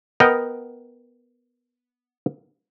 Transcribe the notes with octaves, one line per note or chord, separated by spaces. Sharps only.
B3 A#4 D#5 F#5 G5 A#5